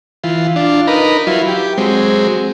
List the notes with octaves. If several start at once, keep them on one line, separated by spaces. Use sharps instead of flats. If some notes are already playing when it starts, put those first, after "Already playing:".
E3 F4
D4 F4
D#4 A#4 B4
F#3 E4 F4
G4
F#3 G#3 C4